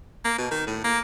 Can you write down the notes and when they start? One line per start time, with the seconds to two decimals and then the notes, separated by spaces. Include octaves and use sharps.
0.25 A#3
0.38 B2
0.51 D#3
0.67 A2
0.84 A#3